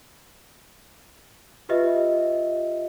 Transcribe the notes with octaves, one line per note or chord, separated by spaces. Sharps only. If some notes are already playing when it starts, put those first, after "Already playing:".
F4 G4 B4 D#5 E5